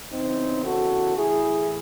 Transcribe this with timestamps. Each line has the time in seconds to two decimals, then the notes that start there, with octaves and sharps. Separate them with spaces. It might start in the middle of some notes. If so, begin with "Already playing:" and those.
0.12 E2 C#3 E3 C4 D#4
0.64 F#4 A4
1.16 A2 E3 E4 G#4